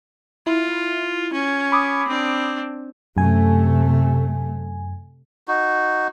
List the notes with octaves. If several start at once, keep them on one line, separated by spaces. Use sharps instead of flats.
E4 F4
C#4
B5 D6 D#6
C4 D4
F#2 C3 A3 G#5
D#4 F#4